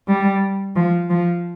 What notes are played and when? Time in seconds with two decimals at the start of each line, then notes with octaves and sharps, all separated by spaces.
0.08 G3
0.76 F3
1.10 F3